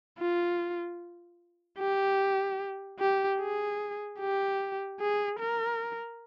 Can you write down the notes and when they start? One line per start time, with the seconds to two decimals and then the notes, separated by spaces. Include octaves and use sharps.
0.19 F4
1.79 G4
2.99 G4
3.40 G#4
4.19 G4
5.00 G#4
5.40 A#4